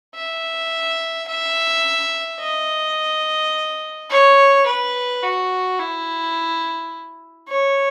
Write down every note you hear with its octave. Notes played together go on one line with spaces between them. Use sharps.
E5
E5
D#5
C#5
B4
F#4
E4
C#5